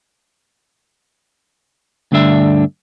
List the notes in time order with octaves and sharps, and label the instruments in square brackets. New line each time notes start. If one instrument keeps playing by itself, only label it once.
[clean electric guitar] D2 G2 D3 D4 E5